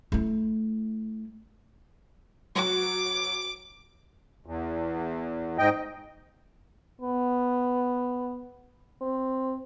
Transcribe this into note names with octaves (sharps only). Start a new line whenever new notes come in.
A3 E4
F#3 F#4 D6
E2
G#2 D#5 G5
B3
C4